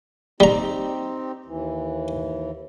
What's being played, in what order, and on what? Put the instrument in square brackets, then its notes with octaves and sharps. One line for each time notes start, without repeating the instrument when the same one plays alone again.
[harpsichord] G3 A#5 [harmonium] C4 D#4 G4
[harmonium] D#2 E3